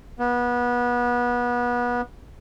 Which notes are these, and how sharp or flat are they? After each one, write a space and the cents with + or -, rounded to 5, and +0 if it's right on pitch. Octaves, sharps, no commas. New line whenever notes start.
B3 -25